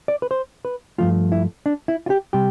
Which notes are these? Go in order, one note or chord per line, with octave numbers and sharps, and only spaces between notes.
D5
B4
C5
B4
G2 F3 A3 F4
E4
D4
E4
F4
G4
C3 G3 G4